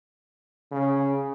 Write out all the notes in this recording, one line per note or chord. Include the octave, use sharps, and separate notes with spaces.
C#3